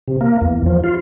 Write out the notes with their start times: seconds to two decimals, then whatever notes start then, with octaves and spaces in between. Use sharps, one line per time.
0.08 C3
0.21 A#3
0.41 E2
0.66 F3
0.84 F4